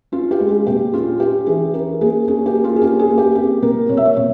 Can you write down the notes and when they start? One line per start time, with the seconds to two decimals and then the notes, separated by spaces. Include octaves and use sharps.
0.12 C#4 F4
0.31 G4
0.40 G#3
0.49 G#4
0.67 A#2 G4
0.93 C#4 F4
1.20 C#4 G4
1.46 E3 G#4
1.73 C#4 A#4
2.01 A#3 G#4
2.28 C#4 G#4
2.46 G4
2.55 A#3
2.64 F4
2.76 G#4
2.82 C#4 G4
2.99 G#4
3.09 A#3
3.18 G4
3.35 C4 G4
3.62 A#2 A#4
3.89 A#2 C#5
3.97 E5
4.05 C#5
4.16 A#2 C#5